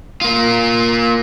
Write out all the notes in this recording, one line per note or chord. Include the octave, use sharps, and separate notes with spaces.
A#3 F4